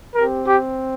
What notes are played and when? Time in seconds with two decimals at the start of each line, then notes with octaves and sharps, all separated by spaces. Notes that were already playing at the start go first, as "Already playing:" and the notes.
0.15 C4 G4 A#4
0.46 G4